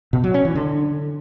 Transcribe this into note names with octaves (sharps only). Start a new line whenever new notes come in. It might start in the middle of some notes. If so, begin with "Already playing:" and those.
B2
F#3
C#4
E3
D3